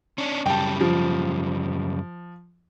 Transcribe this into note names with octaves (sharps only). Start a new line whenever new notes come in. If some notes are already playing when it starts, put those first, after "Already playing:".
C#4 D4
F#2 C#3 G3 G5 A5
F3